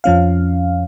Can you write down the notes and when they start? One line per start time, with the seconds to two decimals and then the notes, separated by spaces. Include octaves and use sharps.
0.04 F2 F3 C#4 F5